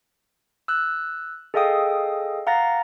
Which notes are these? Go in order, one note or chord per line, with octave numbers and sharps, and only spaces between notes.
E6 F#6
G#4 A4 D#5 F5 G5 D#6
F5 F#5 A#5 A6 A#6